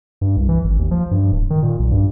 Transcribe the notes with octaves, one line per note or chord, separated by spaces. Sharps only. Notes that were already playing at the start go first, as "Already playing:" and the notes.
G2
C2
E3
G#1
D#2
F3
G2
D1
D#3
A#2
B1
G2